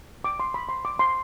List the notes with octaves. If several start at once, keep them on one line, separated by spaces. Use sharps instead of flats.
D6
C6
B5
C6
D6
C6